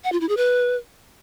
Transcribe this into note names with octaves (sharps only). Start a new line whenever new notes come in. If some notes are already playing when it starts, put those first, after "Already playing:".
F#5
F4
E4
G#4
B4